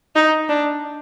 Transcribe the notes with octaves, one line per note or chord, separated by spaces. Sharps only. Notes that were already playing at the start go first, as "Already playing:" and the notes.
D#4
D4